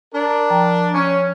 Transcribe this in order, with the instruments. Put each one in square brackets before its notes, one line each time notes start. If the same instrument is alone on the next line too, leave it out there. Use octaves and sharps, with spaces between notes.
[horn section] D4 A#4 D5
[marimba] F3 G5 A#5
[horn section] C#4